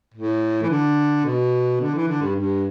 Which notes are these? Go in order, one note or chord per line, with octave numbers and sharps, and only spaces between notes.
A2
E3
D3
B2
D3
E3
D3
G2
G2